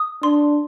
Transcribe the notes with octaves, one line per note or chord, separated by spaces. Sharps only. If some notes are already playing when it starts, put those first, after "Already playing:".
Already playing: D#6
D4 C6